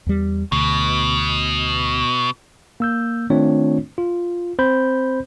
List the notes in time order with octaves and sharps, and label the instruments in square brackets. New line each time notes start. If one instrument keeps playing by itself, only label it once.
[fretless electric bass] E2 G3
[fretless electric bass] D2 [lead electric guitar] B2
[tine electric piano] A#3 E6 G6
D#3 A3 C4 D4 F4 C#5
F4
C4 C5 B5 G6